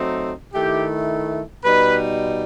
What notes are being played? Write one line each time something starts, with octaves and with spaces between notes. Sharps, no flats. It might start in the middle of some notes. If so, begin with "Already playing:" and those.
Already playing: F#3 A3 C4 D#4
D#3 A3 E4 G4
B2 G3 D#4 B4